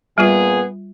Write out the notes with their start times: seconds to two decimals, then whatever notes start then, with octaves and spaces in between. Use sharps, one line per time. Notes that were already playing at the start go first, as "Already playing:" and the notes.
0.18 A#2 G3 B3 F4 G#4